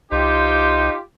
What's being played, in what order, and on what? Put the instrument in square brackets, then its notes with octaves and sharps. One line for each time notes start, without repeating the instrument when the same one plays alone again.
[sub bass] C2 [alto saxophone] D#4 [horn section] F4 G4 [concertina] C5